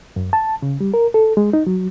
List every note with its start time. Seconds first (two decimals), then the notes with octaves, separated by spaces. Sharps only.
0.16 F#2
0.33 A5
0.62 C#3
0.81 G3
0.94 A#4
1.14 A4
1.37 G#3
1.53 D#4
1.67 F#3